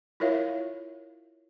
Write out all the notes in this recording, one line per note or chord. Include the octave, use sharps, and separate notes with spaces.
E4 F4 A#4 C#5 E5 F5